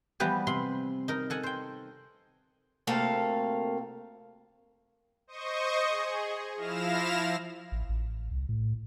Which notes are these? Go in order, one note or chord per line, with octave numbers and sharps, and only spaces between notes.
E3 F3 G3 B3 G4 B4
C3 B5 C6
D#4 A#4
A4 F#5 G#5
C5 G5
D2 C3 A3 A#3 F5 A5
C5 D#5 C#6 D#6
G#4
F3 E4 F5 F6 A#6 E7
A1
A1
C2
A2